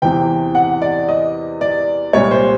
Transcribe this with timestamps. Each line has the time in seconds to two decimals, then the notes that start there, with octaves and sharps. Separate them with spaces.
0.02 E2 C3 E3 G5
0.55 F#5
0.82 D5
1.09 D#5
1.61 D5
2.13 C2 A#2 G3 C#5
2.31 C5